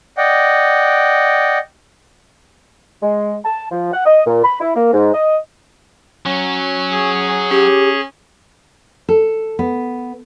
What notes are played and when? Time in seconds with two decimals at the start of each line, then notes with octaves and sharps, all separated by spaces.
0.18 D5 D#5 F#5 G5
3.02 G#3
3.45 A5
3.71 F3
3.93 F#5
4.05 D#5
4.26 A#2
4.44 B5
4.61 E4
4.75 A#3
4.93 G#2
5.13 D#5
6.26 F#3 C#4
6.90 G#4
7.51 C#4 G4
9.09 A4
9.59 B3